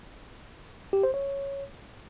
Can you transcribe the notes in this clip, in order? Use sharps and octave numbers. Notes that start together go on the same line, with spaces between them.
G4
C5
C#5